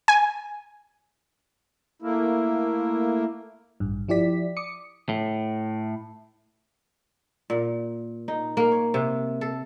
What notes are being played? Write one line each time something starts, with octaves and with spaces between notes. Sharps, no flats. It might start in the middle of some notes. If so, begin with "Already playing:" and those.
G#5
A3 A#3 E4
A1 G2
F3 E4 G4 D5 B6
D6 D#6 C#7
A2
A#2
D#4
A#3
C#5
C3
A4